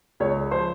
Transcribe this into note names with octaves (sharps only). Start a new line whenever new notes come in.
C#2 C#5
F3 C5